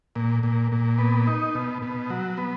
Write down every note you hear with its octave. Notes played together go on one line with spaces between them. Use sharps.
A#2
A#2
A#2
B3
D#4
B2
B2
F#3
B3